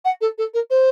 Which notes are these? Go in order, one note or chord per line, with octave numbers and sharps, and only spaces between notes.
F#5
A4
A4
A#4
C5